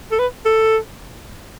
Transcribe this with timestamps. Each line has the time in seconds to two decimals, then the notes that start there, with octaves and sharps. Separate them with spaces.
0.11 A4
0.19 B4
0.45 A4